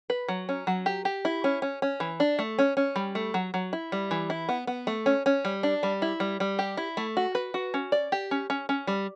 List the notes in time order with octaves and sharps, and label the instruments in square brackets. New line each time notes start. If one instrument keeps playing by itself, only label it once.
[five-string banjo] B4
F#3
C#4
F#3
G4
G4
E4
C#4
C#4
C#4
E3
D4
A3
C#4
C#4
G3
A3
F#3
F#3
E4
G3
E3
E4
B3
B3
A3
C#4
C#4
G3
D4
G3
E4
G3
G3
G4
E4
A3
F#4
B4
F#4
C#4
D5
G4
C#4
C#4
C#4
G3